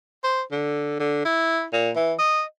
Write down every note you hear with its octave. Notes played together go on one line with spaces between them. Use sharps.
C5
D3
D3
E4
A#2
E3
D#5